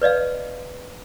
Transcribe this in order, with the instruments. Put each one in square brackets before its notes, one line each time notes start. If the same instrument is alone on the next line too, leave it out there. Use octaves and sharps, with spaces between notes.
[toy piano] B4 D5 D#5 F5